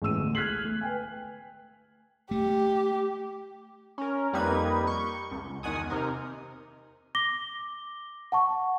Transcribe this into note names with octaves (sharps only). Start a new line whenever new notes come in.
A1 G#3 E6 D#7
D2 G#3 A3
F6 F#6 G#6 B6 C7 F#7
A3
B4 G5 G#5
A3 G4
C#4 A#4
F2 G3 A#3 D#4 B4 G#6
C#6 G6
C#2
E2 D#3 F#5 G#5 D#6
C3 D#4 A#4
D6 A#6 G7
F#5 A5 C#6